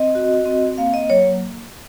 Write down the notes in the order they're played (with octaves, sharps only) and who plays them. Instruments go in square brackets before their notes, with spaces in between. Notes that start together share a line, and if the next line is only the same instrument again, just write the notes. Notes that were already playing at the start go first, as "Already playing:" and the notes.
Already playing: [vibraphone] C4 D#5
F#4
C4
A#3 F5
D#5
F#3 C#5